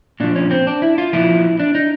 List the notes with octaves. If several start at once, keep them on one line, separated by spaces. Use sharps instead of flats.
A#2 F3 D4
C#4
C4
D4
E4
F4
A#2 F3 E4
D4
D#4